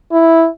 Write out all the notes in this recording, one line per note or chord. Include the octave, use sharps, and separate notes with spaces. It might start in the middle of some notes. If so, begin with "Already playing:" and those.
E4